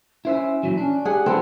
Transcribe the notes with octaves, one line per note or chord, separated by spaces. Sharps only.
C#4 E4 C5 E5
A#2 E3 F#3
C#4 D4
G4 G#4 F#5
F3 B3 C4 D4 A4